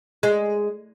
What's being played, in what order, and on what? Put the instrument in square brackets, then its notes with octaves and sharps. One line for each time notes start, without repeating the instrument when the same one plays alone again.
[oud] G#3